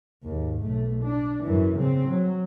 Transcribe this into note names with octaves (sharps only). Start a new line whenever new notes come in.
D#2 G#2
B1 A3
D4
F#2 E3
C#3 C4
F#3